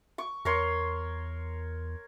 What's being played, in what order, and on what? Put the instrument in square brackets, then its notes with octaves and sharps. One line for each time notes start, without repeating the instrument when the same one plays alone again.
[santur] C#6 D6
[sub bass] E2 [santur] A#4 C#5 C6